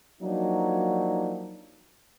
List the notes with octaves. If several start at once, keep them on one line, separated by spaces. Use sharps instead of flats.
F3 F#3 A#3 D4 D#4